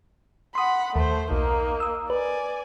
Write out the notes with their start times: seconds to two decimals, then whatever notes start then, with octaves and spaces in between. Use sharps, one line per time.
0.55 F#5 B5 C6 D#6
0.96 D#2 A3 C5
1.31 B1 A#3 D#4
1.80 D#6 E6
2.10 B4 D5 G#5